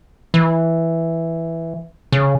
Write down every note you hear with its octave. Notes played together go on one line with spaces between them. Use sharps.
E3
C#3